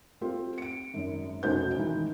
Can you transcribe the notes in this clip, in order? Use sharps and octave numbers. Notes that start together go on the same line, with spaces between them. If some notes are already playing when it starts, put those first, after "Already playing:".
A3 C4 F4 G4
C#7 D7
G#1 F#2
F1 B1 C#4 F#4 C5 G6
G#2 D#3 E3